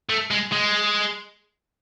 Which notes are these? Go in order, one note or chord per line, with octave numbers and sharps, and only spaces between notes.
A3
G#3
G#3